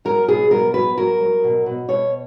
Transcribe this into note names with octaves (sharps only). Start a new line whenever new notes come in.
F#3 A#4
B2 G#4
F#3 A#4
F#3 B4
F#3 A#4
F#3
B2
B2
B2 C#5